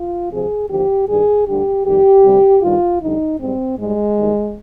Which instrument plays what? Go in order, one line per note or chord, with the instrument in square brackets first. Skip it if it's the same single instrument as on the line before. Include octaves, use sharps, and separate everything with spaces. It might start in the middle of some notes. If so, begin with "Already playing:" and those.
Already playing: [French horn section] F4
D2 C3 F3 G#4
D#2 D3 F3 G4
G2 D#3 G3 G#4
D2 D3 G3 G4
F2 D#3 G3 G4
D2 C3 G3
G2 D#3 G3 F4
F2 D3 G3 D#4
G#2 G3 C4
G#2 G3 G#3
D#2 D#3 G3